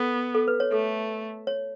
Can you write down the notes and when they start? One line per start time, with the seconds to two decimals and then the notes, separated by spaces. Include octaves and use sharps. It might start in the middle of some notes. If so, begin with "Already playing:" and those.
Already playing: B3 A4
0.35 A4
0.48 B4
0.60 C#5
0.72 A3 A4
1.47 C#5